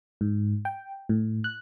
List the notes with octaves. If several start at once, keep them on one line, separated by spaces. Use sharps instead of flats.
G#2
G5
A2
F#6